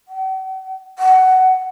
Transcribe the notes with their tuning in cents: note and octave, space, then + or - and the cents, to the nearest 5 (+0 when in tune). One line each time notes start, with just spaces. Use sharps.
F#5 +45
F#5 +15